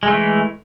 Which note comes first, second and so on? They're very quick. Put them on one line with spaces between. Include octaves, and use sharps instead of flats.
G#3 A3 E3